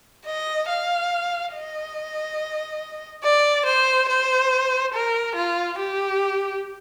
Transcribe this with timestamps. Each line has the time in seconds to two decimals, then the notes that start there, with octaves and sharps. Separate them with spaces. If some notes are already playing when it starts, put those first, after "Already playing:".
0.25 D#5
0.68 F5
1.53 D#5
3.24 D5
3.66 C5
4.09 C5
4.94 A#4
5.36 F4
5.79 G4